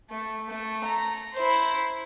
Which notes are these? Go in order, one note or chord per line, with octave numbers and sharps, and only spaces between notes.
A3
A3
A#5
E4 C5